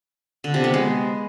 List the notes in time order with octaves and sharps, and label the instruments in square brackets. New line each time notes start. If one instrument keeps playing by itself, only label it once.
[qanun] D3
C3
B3
G#3